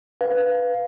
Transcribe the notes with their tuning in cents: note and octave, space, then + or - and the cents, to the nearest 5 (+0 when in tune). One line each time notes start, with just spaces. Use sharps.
B4 +5 F5 +0